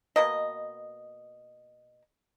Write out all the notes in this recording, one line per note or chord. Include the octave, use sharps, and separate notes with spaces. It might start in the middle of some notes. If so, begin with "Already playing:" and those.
B2 A#3 D#5